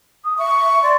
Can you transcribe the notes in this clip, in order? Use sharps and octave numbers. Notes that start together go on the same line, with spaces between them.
D#6
E5 C#6
D5 C6